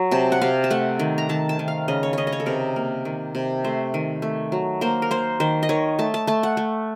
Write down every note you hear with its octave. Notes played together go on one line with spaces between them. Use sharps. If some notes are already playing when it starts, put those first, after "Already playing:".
Already playing: F#3
C3 A5
F#5
C3 F5
A5
A3 F#5
D#3
A#5
D#3 A5
A5
D#3
F5
C#3 D#5
C#5
C#3 C#5 D#5
D#5
C#5
A4
C3 A#4
A#3
D#3
C3
A3 C5
D#3
A3
F#3
A#3 C5
A#4
A#3 C5
D#3 C5
D#5
D#3 C#5
A3 A5
A5
A3 A5
F#5
A3